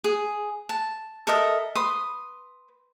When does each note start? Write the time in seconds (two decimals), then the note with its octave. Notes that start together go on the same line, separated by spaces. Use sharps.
0.04 G#4
0.69 A5
1.27 A4 A#4 D#5 E5
1.75 B4 C6 D#6